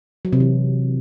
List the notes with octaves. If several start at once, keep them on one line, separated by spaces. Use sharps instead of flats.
F#3
C3
E3